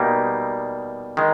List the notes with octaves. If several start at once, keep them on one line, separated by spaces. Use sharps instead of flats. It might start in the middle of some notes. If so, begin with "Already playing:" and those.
Already playing: B2 G3 A#3 D#4
D#3 G#3